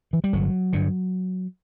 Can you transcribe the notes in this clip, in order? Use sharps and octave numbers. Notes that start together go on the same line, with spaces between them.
E3
G3
G1 F#3
G2 D3